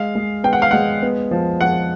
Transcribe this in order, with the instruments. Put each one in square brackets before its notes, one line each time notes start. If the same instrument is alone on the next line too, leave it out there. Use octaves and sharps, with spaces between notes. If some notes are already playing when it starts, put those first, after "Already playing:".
Already playing: [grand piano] G#3 [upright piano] F5
[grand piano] G#3
[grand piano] B3 [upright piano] G5
[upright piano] F#5
F5
[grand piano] G#3 [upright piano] F#5
[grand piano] B3
F3
[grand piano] F3 [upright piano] F#5